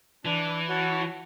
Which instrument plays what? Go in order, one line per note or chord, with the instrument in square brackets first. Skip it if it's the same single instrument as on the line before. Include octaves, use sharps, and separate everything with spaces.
[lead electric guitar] E3 [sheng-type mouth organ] D4
[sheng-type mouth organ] F#4 C#5 F#5 A5